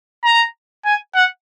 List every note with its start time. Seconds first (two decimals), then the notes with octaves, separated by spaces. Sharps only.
0.24 A#5
0.85 G#5
1.15 F#5